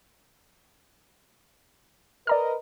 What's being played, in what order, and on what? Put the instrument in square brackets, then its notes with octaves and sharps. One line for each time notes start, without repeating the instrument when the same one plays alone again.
[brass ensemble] A#4 B4 D#5 [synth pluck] D5 A#5 F6